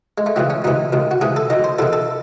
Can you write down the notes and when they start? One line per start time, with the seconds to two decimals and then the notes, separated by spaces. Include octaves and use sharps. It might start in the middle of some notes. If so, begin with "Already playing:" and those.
0.18 G#3
0.26 A3
0.36 C#2 C#3 E3 C4
0.50 C#4
0.64 C#2 C3 E3 D#4
0.92 C#2 C3 D#3
1.11 F#4
1.21 C#2 C3 E3 G#4
1.36 A4
1.50 F#2 D#3 D#5
1.64 C5
1.79 E2 C3 D#3 A4
1.93 A4